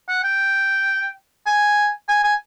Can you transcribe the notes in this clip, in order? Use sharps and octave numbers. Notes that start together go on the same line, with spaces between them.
F#5
G5
G#5
G#5
G#5